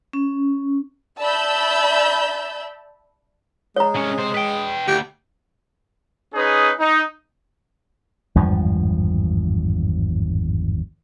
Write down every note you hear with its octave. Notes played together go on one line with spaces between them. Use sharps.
C#4
D5 E5 A5 B5 E6 G6
G#3 C#5 A#5
C2 C#4
C3 C5
B4 G5
D2 G4
C#4 D#4 G#4 B4
D#4
G#1 E2 G2 F3